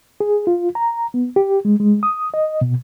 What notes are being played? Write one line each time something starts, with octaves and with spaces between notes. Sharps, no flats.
G#4
F4
A#5
B3
G4
G#3
G#3
D#6
D#5
B2